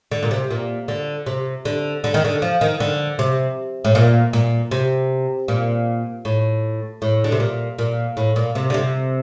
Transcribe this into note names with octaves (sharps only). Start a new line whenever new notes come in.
D3
A#2
C3
A#2
D3
C3
D3
D3
D#3
D3
F3
D#3
D3
C3
A2
A#2
A#2
C3
A#2
A2
A2
D3
C3
A#2
A#2
A2
A#2
C3
D3
C3